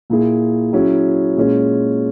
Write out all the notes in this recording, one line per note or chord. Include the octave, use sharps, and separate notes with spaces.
A#2 A#3 E4 G#4
F#3 C#4 E4 G#4
A#2 G#3 C#4 G#4